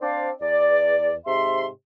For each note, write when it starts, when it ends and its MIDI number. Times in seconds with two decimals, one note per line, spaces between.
0.01 0.30 60
0.01 0.30 62
0.01 0.30 72
0.01 0.30 74
0.01 0.30 77
0.40 1.14 40
0.40 1.14 74
1.26 1.66 44
1.26 1.66 48
1.26 1.66 76
1.26 1.66 84